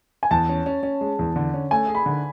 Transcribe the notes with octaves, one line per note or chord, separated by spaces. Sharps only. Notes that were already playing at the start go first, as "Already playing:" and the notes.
G#5
E2 A5
C#4
C#4
C#4
G#3
E2
D3
C#4
A3 G#5
G#4
B5
D3